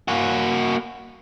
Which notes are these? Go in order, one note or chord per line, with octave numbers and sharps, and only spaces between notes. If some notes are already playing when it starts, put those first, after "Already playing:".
A#3 F#4